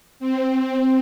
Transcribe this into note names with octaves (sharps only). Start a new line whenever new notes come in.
C4